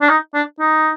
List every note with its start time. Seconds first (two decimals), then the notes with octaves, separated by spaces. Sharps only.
0.01 D4
0.09 D#4
0.34 D4
0.59 D#4